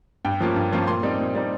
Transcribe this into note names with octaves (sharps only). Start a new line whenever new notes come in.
G2 G5
F3 A#3 C#4 F4
G2
F3 A#3 C#4 F4
A#2 C6
G3 C4 D#4
A#2
G3 C4 D#4